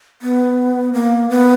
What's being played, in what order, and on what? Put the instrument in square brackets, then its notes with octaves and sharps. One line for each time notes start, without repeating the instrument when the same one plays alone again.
[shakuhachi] B3
A#3
B3